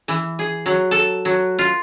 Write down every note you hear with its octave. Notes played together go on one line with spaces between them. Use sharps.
E3
G#4
F#3
A4
F#3
F4